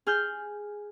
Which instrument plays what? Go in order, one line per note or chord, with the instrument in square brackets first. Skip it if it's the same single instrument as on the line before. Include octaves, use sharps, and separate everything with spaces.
[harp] G#4 F6 G6